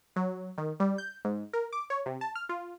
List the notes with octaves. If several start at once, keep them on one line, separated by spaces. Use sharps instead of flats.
F#3
D#3
G3
G6
G#2
A#4
D6
C#5
C3
A5
F6
F4